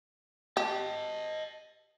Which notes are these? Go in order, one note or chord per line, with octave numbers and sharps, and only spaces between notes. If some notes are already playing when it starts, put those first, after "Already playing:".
G4 D#5 A5